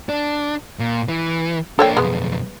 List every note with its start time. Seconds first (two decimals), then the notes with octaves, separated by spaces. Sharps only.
0.09 D4
0.79 A#2
1.08 E3
1.79 A#3 D4 A4 C#5 G5
1.97 B1 F2 G#3 B3